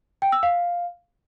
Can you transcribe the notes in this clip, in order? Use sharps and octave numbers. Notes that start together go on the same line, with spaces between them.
G5
E6
F5